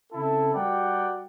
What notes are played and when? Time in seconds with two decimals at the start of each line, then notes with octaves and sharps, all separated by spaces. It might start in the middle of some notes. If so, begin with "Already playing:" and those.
0.13 C#3 C4 E4 A4
0.54 G3 F#4 A#4 D5 F#5 G5